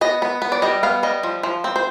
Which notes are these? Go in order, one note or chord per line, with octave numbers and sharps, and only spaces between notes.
B3 D#5
B3
B3
D5
G3 D#5
B3 F5
G3 D#5
F3
F3
C4
C5